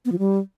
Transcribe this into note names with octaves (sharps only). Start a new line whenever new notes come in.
B3
F3
G3